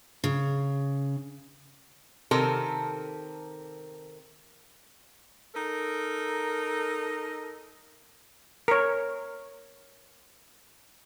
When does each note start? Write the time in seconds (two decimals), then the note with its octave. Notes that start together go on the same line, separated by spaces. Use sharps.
0.24 C#3
2.31 C3 D#3 A4 A#4
5.55 D#4 A4 A#4
8.68 A#4 C#5